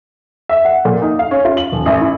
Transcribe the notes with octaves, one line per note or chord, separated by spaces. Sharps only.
E5
F#5
A#2
D#4
F5
C#4
F4
F#7
D#1
A1
E4